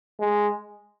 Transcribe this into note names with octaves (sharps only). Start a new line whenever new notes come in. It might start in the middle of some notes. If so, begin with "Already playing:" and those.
G#3